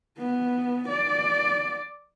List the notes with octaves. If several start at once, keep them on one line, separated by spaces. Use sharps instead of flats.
B3
D5